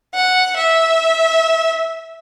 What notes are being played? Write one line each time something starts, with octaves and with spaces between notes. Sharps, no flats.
F#5
E5